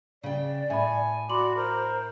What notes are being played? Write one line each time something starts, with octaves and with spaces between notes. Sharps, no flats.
C#3 D5 G5
A2 E5 G#5 B5
F#4 D5 B5 C6 F#7
A#4 C5